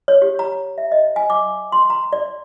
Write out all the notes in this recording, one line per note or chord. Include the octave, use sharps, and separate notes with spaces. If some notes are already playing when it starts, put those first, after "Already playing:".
C#5
G4
A#5
E5
D#5
G#5
D6
C6
A#5
D5